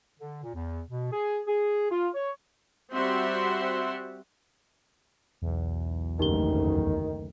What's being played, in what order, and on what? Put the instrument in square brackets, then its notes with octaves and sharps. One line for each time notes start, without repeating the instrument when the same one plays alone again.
[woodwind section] D3
A#2
E2
B2
G#4
G#4
F4
C#5
[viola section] G3 C4 F#4 E5 F#5 C6
[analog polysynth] B1 E2
[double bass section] F#1 D2 [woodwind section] D#3 [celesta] D#4 G4 G7